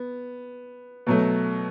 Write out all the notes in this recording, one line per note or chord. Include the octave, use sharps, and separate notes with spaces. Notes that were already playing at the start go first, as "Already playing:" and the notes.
Already playing: B3
B2 F#3 A3